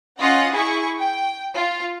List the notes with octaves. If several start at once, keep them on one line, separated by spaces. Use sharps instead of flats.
C#4 F4 D#5 F#5
E4 G#4 C#6
G5
F4